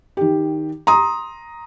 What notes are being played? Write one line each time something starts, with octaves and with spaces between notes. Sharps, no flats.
D#3 G4
A#5 C6 D#6